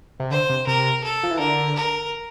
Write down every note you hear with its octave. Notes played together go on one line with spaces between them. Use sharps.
C3
D3 C5
C3
C3 A#4
A4
F3
E3
D3 A#4
A#4